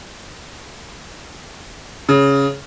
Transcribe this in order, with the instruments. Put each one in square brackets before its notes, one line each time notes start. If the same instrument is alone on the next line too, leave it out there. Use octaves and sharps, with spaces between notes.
[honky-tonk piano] C#3